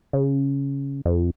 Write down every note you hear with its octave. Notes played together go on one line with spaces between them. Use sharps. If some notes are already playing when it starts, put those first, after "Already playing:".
C#3
F2